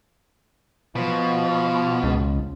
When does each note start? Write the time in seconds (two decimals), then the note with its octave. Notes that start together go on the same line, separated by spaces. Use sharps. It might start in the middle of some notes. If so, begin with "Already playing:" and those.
0.96 B2 F3
2.03 C#2